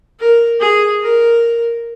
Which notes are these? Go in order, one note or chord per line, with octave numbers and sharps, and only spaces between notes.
A#4
G#4
A#4